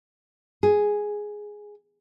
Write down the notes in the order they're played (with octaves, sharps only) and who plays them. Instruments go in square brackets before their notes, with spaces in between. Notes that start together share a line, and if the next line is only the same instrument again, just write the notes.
[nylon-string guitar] G#4